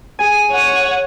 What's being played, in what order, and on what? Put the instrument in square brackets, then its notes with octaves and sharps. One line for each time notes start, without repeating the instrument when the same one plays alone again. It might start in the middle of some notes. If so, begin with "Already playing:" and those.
[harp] G#4 G#5 [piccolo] D#7
[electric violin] C#5 F#5